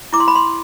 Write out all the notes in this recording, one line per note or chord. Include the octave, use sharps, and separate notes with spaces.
E4 D6
C6
B5
C6